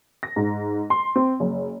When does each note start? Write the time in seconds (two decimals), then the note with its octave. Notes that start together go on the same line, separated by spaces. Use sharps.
0.23 A#6
0.36 G#2
0.90 C6
1.16 C4
1.40 F#1